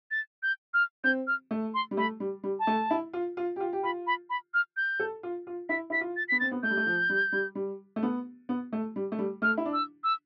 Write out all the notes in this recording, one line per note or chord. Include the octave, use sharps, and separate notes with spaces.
A6
G6
F6
C4 G6
F6
A3
C6
G3
A3 B5
G3
G3
A5
A3
E4
F4
F4
G4
F4
G4
F4 B5
B5
B5
F6
G6
A4
F4
F4
E4 B6
E4 B6
F4
A6
B3 B6
C4 A6
B3
A3 G6
G3
A3
F3
G3
G3
G3
A3
B3
B3
A3
G3
A3
G3
A3 F6
E4
D4
E6
E6